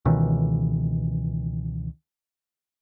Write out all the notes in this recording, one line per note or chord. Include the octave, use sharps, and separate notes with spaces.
C#2 B2 D#3 E3